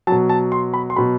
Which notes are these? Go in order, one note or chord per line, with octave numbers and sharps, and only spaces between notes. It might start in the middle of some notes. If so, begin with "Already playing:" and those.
B2 F#3 A5
A5
C6
B5
C6
B2 F#3 B5